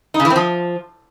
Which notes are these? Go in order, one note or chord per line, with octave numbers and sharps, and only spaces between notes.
D#4
C#3
E3
C4
F3